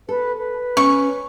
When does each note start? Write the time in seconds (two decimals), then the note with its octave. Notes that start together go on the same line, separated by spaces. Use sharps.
0.09 A4 B4
0.38 B4
0.77 C#4 C#6